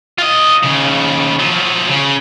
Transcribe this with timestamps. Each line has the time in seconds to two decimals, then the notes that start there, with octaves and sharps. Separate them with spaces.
0.18 F4 D#5
0.64 D#2 C#3
1.39 F3 F#3
1.90 C#3